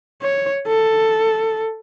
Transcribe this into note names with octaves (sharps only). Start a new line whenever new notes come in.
C#5
A4